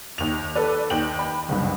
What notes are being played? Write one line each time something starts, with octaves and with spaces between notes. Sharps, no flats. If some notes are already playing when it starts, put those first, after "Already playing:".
D#2 F7
A4 B4 D5
D#2 G5 F#7
G5 B5
F#1 C2 G2